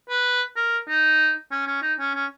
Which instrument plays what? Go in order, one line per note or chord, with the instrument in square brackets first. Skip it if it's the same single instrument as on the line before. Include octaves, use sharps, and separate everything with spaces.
[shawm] B4
A#4
D#4
C#4
C#4
D#4
C#4
C#4